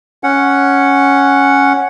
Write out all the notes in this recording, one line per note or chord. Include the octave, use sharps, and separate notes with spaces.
C#4 F#5